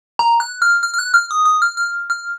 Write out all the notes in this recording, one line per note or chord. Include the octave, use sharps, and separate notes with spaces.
A#5
F#6
F6
F6
F6
F#6
F6
D#6
D#6
F6
F6
F6